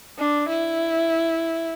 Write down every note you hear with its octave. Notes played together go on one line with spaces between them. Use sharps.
D4
E4